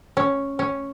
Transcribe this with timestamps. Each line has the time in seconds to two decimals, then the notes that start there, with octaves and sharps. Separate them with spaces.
0.17 C#4
0.59 C#4